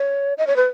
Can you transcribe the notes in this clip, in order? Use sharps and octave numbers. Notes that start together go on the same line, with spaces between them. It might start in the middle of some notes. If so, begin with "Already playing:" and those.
Already playing: C#5
D#5
C#5
B4